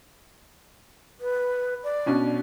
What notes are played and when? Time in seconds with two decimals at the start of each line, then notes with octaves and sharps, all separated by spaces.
1.21 B4
1.84 D5
2.06 B2 C#4 D4